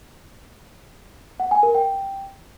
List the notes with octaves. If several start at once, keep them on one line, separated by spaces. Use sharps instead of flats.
F#5
G#5
A#4
G5